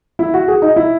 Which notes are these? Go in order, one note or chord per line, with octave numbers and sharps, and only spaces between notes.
E4
F#4
G#4
D#4
E4